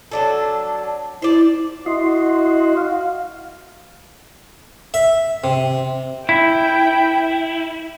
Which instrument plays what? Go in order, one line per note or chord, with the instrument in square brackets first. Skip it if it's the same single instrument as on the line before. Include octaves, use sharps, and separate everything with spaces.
[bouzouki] F#3 D4 A4
[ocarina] E4 [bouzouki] C5 D5
[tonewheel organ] E4 D#5 C6 [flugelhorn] F#4
[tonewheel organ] F5
[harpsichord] E5
C3
[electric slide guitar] E4 [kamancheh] G5